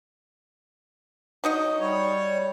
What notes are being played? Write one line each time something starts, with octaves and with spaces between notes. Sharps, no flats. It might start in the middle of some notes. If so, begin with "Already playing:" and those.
F#3 D#4 D#5
G3 C#5